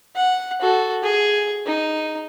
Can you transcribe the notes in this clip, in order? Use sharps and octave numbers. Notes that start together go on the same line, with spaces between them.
F#5
F#4 A4
G#4
D#4